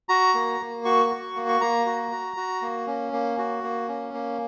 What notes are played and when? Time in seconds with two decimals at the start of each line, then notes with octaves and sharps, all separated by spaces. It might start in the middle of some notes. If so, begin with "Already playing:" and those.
0.09 F#4 A#5
0.34 A#3
0.60 A#3
0.85 F#4 C#6
1.10 F#4
1.36 A#3
1.49 C#6
1.61 A#3 A#5
1.86 F#4
2.11 F#4
2.37 F#4
2.62 A#3
2.87 C#4
3.13 A#3
3.38 F#4
3.63 A#3
3.89 C#4
4.14 A#3